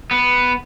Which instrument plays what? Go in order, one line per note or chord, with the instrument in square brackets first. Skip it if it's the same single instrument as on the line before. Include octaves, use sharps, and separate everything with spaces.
[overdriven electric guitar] B3